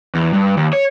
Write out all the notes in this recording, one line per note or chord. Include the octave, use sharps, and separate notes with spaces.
E2
G2
D#2
C#5